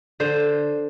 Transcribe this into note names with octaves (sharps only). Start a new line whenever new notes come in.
D3 C5